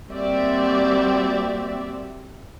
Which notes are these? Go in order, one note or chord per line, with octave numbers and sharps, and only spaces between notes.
G3 A#3 C4 F#4 D5 E5